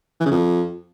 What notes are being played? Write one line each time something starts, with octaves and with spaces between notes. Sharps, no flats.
E3
C#3
F2